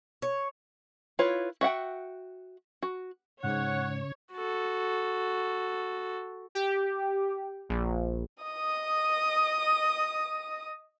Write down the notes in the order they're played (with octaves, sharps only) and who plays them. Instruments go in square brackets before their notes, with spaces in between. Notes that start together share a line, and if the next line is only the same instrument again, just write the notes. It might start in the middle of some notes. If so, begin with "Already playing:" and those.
[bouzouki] C#5
[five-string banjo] E4 F4 B4 C#5
F#4 E5 F#5 G5
F#4
[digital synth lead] G#2 [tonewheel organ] C#3 [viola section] C#5 [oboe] F#5
[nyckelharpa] F#4 A4
[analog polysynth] G4
A#1
[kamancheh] D#5 D#6